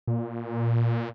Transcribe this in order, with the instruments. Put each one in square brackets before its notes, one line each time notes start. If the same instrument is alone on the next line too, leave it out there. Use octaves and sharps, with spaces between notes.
[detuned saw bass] A#2